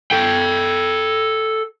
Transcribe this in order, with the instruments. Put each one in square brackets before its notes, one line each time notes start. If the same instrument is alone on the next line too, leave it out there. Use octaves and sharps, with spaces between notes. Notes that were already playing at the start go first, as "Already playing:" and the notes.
[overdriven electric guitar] A4 G5